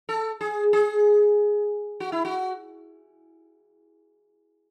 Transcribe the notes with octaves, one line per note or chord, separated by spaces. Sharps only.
A4
G#4
G#4
F#4
E4
F#4